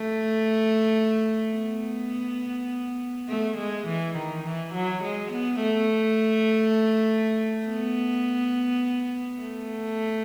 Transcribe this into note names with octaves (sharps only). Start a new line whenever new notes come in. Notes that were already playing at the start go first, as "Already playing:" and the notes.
Already playing: A3
B3
A3
G#3
E3
D#3
E3
F#3
G#3
B3
A3
B3
A3